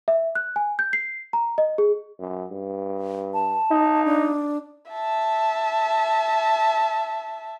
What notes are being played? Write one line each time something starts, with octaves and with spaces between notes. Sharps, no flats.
E5
F#6
G#5
G6
C7
A#5
D#5
G#4
F#2
G2
A5
D#4
D4
E5 A5